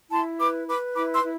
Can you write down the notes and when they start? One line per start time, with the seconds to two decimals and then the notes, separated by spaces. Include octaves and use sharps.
0.11 E4 A5 C6
0.39 B4 B5 D6
0.67 B4 B5 D6
0.95 E4 B5 D6
1.13 C6 E6
1.22 E4